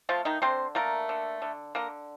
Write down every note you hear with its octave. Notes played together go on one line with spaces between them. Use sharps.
F3 A3 F4
D#3 D#4
D3 C4 C5
A3 A#3 A#4
D3
D3
D3 A#3 A#4